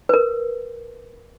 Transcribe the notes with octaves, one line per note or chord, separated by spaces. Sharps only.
B4
A#4